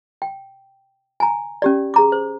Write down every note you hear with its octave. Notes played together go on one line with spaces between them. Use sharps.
G5
G#5 A#5
C#4 G4 D5
G#4 A#5 D6
C5